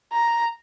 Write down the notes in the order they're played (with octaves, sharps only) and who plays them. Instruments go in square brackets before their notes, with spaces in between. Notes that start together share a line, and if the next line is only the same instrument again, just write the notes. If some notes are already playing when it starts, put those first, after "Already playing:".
[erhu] A#5